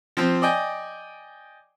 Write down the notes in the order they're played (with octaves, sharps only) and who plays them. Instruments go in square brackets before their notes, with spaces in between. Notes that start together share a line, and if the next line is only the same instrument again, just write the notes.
[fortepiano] F3 C4
D5 D#5 G5 G#5